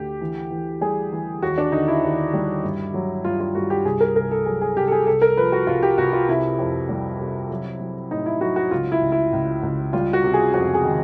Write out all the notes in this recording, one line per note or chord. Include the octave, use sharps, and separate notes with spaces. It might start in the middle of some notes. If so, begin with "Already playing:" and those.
Already playing: D2 D3 G4
E3
E3
G3 G#4
E3
D#2 F#4
D4
D3 D#4
E4
D#2
G3
G2
F#3
G2 F4
F4
G2 F#4
G4
C2 G#4
A#4
C2 A#4
A4
F#3 G#4
G#4
C2 G4
A4
G#4
C2 A4
A#4
F3 B4
F#4
C2 F4
G4
C2 F#4
F4
C3 E4
F2
G3
C3
F#3
F#3
A2 D#4
E4
F#3 F#4
F#4
C#2 F4
E4
C#2
E4
C#2
C#2
G3 F4
F#4
C3
G#4
F2 F#4
G#4
D#3